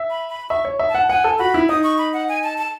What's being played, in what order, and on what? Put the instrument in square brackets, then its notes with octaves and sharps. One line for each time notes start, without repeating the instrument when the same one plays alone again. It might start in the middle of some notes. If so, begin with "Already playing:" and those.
Already playing: [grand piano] E5
[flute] B5
B5
[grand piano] E5 [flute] C#6
[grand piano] C#5
E5
[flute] A5
[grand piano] F#5
[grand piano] F#5 [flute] G#5
[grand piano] A4
[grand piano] F#4 [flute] B5
[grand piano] E4
[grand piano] D#4 [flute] D#6
[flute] C#6
B5
F#5
G#5
A5
A5